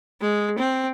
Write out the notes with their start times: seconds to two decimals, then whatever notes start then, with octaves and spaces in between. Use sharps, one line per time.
0.21 G#3
0.58 C4